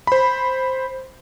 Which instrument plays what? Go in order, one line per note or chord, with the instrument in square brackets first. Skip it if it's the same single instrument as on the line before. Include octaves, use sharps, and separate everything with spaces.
[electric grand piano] C5 B5